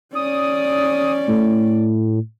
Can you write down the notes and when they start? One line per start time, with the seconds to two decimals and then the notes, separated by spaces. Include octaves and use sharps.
0.15 C#4 D5 D#6
1.27 A2